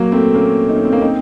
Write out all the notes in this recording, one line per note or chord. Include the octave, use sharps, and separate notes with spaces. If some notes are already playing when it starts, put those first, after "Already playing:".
Already playing: F#3 A#3
A3 C4
A#3 C#4
D#4
C#4
C4
A#3 C#4
C4 D#4